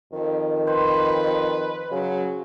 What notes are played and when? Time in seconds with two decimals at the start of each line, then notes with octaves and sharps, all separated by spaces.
0.13 F2 D#3
0.67 B4 C5
1.92 C#3 F#3